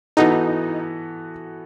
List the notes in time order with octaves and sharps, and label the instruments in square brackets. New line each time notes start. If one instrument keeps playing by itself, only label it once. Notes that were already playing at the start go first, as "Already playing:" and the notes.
[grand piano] E3 B3 F#4 A4 [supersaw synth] D#4